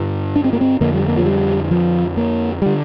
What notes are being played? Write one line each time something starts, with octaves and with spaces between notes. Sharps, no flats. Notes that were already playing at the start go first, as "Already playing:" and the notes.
Already playing: G2 D3
D4
C4
A#3
C4
F2 D3 A#3
G3
A#3
F3
G3
F3
A#3
D3 G3